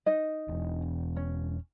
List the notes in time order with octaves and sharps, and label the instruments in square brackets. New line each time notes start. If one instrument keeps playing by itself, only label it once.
[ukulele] D#4 D#5
[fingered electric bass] E1
[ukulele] C#4